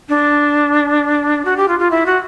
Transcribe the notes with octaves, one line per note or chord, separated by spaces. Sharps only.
D4
F#4
G4
F4
F4
E4
F#4